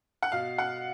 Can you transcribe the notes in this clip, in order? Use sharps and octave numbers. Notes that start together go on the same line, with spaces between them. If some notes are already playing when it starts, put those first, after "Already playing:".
F#5
B2 F5
F#5